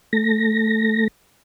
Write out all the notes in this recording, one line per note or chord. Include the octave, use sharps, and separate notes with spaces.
A3 A#6